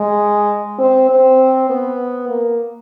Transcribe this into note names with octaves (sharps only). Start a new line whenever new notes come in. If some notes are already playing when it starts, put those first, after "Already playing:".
Already playing: G#3
C4
C4
B3
A#3